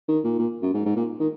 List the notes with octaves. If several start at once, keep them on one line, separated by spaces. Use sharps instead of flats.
D#3
A#2
A#2
F#2
G#2
G#2
A#2
D#3